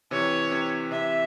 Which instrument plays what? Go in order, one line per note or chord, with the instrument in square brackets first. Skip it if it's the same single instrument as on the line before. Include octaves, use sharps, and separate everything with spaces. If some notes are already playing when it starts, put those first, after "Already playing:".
[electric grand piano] C3 E3 [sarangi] C#5
[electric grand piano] C3
[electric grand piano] C3 [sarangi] E5